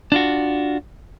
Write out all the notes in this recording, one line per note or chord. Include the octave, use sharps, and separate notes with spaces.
D4 F4 F#4